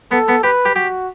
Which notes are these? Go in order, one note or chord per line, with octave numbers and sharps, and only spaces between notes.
B3 A4
B3
G4 B4
G4
F#4 G4